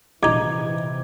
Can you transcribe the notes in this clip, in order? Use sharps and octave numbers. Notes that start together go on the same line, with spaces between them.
A#1 C3 E3 D#4 D#5 D6 G#6